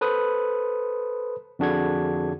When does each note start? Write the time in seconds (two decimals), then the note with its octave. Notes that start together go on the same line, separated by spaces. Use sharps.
0.01 A4 B4 C5 D#6
1.59 F2 D3 D4 F#4 G#4 G#6